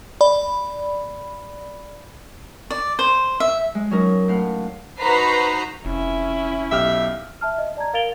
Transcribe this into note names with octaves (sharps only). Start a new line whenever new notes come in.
D5 B5
D5
C5
E5
G#3
F#3 C#4 D#4 A#4
A2 F5 F#5
D#4 F#4 B4 C5 A#5 C7
F1 C#4 E4
B1 G4 E5 F6
E5 A5 F6
D#5
D5 A5 A#5 G#6
A#4 F5 A6 D7 F7 G7